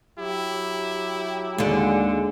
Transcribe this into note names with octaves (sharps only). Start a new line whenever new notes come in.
F#3 E4 G4
D#2 D3 G#3